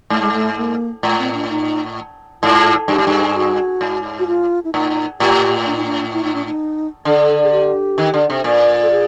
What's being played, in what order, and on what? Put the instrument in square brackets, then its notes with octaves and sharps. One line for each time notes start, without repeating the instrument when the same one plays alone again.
[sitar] G#2 [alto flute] A3
[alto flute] G#3
A3
A#3
[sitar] A2 [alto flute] A3
[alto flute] C4
D4
D#4
[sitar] G#2 [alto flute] F4
[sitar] G2 [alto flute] G4
[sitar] G#2
G2
[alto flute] F#4
[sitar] G#2
[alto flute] F#4
F4
E4
[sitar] A2 [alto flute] D#4
[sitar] A2 [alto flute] G4
[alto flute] D4
D#4
D4
E4
D#4
D4
D#4
[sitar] D3 [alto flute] A4
[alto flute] G#4
G4
[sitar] D#3
D3
C3
A#2
[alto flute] A4
G#4